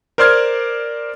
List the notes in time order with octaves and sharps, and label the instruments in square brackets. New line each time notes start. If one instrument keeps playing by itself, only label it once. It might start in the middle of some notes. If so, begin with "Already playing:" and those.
[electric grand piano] A#4 C5 D5 C6 F6 G#6